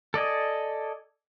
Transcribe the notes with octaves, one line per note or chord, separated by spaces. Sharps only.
A4 D5 D#5 G#5